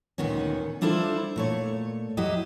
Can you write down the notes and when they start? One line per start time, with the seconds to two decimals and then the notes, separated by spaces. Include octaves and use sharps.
0.18 D2 A#2 D#3 B3 C#4
0.81 G3 D4 E4 F4 A4 C5
1.36 A#2 A3 C#5
2.17 F#3 E4 G4 D#5